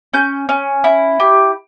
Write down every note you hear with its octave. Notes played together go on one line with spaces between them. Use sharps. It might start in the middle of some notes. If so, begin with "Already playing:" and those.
C#4 G6
C#4
E4
G4